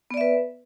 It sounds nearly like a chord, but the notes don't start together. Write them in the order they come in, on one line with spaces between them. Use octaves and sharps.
B3 D5 E5 B4